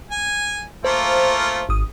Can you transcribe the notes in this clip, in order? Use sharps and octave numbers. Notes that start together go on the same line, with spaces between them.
G#5
A3 A#3 F4 C5
G#1 D#6